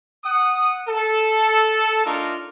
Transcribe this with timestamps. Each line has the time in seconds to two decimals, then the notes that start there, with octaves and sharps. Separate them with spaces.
0.24 F#5 D#6
0.87 A4
2.05 A3 D4 D#4 F4 A#4